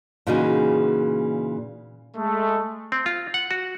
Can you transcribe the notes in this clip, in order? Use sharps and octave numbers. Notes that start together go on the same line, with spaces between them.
A#2 C#3 E3 D#4 F#4 G#4
G#3 A3
C4
F4
F#5
F#4